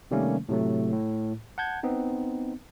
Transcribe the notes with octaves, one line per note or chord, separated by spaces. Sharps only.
C3 D#3 G3 A3 A#3 C#4
A2 C3 F#3 A3
A2
F#5 A5 G6 G#6
B3 C4 D#4